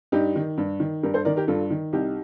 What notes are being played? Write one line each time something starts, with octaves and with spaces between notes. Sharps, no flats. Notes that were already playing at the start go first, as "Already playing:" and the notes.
G2 D#4 G4
D#3
G2
D#3
G2 G4 A#4
A4 C5
D#3 A#4 D5
G4 A#4
G2 F4 A4
D#3
C2 D#4 G4